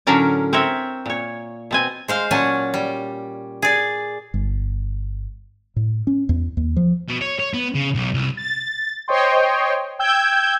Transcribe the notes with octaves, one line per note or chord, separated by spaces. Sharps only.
A2 D3 F#3 C#4 A#4 D5
C4 A#4 C#5 E5
A#2 C#5
B2 C4 G#5
G#3 C5 F5
A#2 F#3 C#4 F#5 G#5 A5
G3
G#4 D5
G1
A2
C#4
E2
D#2
F3
B2
C#5
C#5
B3
C#3
B1
C2
A6
C5 C#5 D#5 G5 C6
G5 E6 G6 G#6